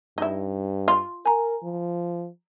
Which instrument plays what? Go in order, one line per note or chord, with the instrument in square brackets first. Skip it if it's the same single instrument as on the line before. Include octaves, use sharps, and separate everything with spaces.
[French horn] G2 [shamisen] D#4 E4
[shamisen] F4
[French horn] A#4 [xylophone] G#5 A#5
[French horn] F3